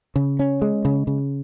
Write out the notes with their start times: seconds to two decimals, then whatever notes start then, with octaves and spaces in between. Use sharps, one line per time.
0.16 C#3
0.39 C#4
0.62 G#3
0.85 C#3
1.07 C#3